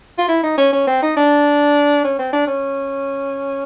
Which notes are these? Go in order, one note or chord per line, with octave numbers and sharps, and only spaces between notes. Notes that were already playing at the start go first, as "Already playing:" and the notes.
F4
E4
D#4
C#4
C#4
C4
D#4
D4
C#4
C4
D4
C#4